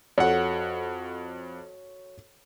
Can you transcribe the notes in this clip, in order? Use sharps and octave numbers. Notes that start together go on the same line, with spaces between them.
F2 F#4 A4 C#5 F#5